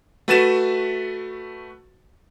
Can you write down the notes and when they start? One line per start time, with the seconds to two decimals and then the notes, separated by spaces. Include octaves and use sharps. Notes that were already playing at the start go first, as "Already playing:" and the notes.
0.28 A3 F#4 B4 A6 D#7 E7